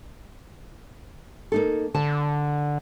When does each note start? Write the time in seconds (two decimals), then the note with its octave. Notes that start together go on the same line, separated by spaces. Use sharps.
1.52 A#3 D#4 A4
1.95 D3 A5